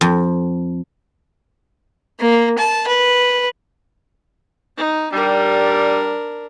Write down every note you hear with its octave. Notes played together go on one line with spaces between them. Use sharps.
F2
A#3
A5
B4
D#4
G3 D4 A#4